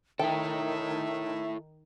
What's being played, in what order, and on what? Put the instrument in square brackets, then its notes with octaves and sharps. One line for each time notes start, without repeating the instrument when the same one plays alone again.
[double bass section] D#3 [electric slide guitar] E4 A4 [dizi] E5 [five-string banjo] G5